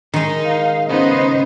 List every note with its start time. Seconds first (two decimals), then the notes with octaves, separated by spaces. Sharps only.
0.14 D#3 G#3 D#4
0.45 F5
0.89 C#3 B3 D#4 C5 D#5